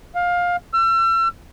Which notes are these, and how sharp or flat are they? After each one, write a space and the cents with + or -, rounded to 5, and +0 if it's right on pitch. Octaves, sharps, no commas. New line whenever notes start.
F5 +20
E6 +40